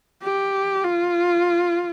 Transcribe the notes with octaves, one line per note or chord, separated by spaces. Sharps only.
G4
F4